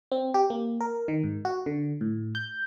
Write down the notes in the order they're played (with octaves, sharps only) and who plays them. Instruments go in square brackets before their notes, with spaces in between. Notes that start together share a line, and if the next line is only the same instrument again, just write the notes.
[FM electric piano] C4
G4
A#3
A#4
D#3
G#2
F#4
D3
A2
G6